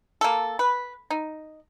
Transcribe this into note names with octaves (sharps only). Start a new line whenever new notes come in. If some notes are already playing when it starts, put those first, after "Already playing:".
A#3 A4
B4
D#4